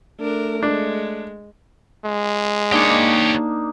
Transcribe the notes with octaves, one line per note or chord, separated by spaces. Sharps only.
A3 D4 A#4
G#3 D4
G#3
A#3 D4 D#4 G4 C#5